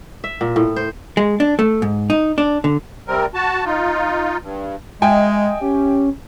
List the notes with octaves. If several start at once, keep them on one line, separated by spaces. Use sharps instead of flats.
E5
A#2
A2
C5
G#3
D4
A3
G#2
D#4
D4
D3
C3 G3 C4 A#4
F#4 A5
D#4 F4
G2
G#3 D#5 E5 G5 G#5
C#4 G4